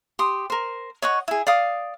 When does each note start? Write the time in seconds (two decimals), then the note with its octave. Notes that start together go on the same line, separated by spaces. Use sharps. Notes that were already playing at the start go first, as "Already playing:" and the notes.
0.19 G4 C6 D#6
0.50 A#4 C5
1.02 C#5 D#5 F#5 C#6
1.28 E4 G#4
1.47 D5 F5 D#6